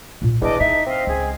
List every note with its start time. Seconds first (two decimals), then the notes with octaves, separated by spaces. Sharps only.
0.22 A#2 F4
0.42 E2 G#3 D4 E4 D#5 D6
0.60 D#4 E4 E5
0.87 C4 D#5 F5
1.07 C#2 G#4